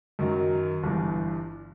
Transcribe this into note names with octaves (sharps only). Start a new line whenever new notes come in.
F#2 D#3 F#3
G1 G2 E3